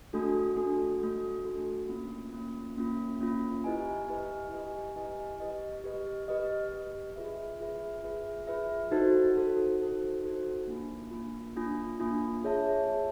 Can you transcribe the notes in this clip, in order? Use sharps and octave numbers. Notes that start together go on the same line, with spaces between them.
A3 D4 F#4 A4
A3 D4 F#4 A4
A3 D4 F#4 A4
A3 D4 F#4 A4
A#3 C#4 F4
A#3 C#4 F4
A#3 C#4 F4
A#3 C#4 F4
E4 G4 B4 D#5 G#5
E4 G4 B4 D#5 G#5
E4 G4 B4 D#5 G#5
E4 G4 B4 D#5 G#5
G4 B4 D#5
G4 B4 D#5
G4 B4 D#5
G4 B4 D#5
F4 G#4 B4 E5
F4 G#4 B4 E5
F4 G#4 B4 E5
F4 G#4 B4 E5
D#4 F#4 A4 C5
D#4 F#4 A4 C5
D#4 F#4 A4 C5
D#4 F#4 A4 C5
A#3 D4 F4
A#3 D4 F4
A#3 D4 F4
A#3 D4 F4
F4 G#4 C#5 E5 A5
F4 G#4 C#5 E5 A5